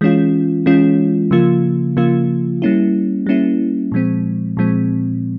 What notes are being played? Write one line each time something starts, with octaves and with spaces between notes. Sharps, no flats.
E3 G#3 C#4 F4
E3 G#3 C#4 F4
C#3 F3 A#3 F4
C#3 F3 A#3 F4
G3 A#3 C#4 E4
G3 A#3 C#4 E4
A#2 F3 G#3 C4
A#2 F3 G#3 C4